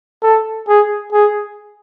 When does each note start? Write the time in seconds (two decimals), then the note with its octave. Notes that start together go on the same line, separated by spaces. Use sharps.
0.23 A4
0.68 G#4
1.13 G#4